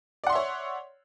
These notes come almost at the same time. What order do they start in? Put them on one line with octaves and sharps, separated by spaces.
D5 F#5 C6 E5 C#5